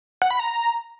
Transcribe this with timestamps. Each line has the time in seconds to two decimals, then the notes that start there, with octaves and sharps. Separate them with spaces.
0.22 F#5
0.31 B5
0.39 A#5